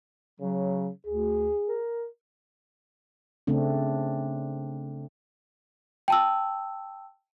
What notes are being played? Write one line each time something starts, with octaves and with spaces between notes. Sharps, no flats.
C#3 F#3
D2 G#4
A#4
C#3 A3 C4 D4
G5 A5 E6